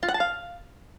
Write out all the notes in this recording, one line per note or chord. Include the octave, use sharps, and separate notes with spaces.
F4
F#5
A5
F5